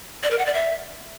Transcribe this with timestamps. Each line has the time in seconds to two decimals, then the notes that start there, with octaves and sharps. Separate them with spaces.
0.23 D5
0.31 A#4
0.38 F#5
0.46 D5
0.54 E5